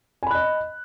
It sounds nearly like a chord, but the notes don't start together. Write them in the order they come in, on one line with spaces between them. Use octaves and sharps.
G#5 B5 F#6 D#5